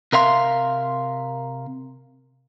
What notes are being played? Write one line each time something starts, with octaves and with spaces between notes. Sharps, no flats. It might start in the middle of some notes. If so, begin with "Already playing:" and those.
C3 A#4 E5 F5 C6